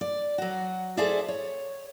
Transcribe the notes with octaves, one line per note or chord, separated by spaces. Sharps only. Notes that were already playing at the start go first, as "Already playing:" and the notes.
D5
F#3 F#4
G#4 A4 C5 D5 E5
C#5